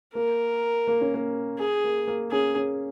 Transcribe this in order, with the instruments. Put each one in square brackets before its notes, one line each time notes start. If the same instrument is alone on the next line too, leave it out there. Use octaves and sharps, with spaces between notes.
[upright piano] A#3 [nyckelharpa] A#4
[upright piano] A#3
C#4
A#3
[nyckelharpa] G#4
[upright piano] A#3
A#3
[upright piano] C#4 [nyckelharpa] G#4
[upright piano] C#4